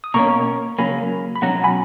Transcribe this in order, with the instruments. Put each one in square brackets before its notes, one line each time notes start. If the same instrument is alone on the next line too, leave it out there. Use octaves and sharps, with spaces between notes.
[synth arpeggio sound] D#6
[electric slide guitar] B2 A#3 C#4 [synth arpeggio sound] A#5 C#6
[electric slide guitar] C#3 F#3 A#3 [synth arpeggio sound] G#5 B5
[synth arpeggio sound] B5
[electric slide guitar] B2 F#3 C#4 F#4 [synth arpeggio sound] F#5 A#5
[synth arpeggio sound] G#5 B5